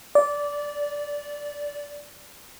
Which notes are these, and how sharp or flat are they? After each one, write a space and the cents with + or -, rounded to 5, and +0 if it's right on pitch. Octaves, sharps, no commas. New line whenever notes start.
D5 -15